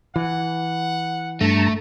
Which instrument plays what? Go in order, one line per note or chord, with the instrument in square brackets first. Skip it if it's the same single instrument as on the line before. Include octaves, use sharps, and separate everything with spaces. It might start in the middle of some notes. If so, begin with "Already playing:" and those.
[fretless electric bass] E3 [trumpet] F#5
[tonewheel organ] G2 A5 A#5 [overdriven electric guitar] A3